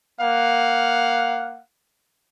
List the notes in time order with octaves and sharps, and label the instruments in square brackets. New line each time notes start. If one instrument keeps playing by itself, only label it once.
[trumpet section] A#3 F5 F#5